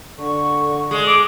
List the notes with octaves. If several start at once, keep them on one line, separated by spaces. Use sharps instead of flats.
D3 C#6
G#3
D6